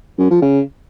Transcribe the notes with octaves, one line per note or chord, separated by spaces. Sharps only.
F#2
F3
C#3